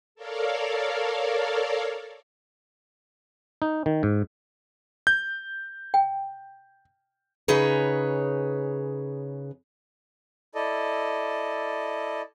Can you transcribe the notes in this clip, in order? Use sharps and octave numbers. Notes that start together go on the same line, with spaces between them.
A4 A#4 C#5 D5 F5
D#4
D#3
G#2
G6
G5
C#3 D#4 G#4 B4 C#5
E4 A4 D5 D#5